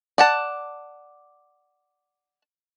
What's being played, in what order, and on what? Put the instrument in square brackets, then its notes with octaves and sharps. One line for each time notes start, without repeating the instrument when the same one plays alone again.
[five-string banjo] D5 F#5 A5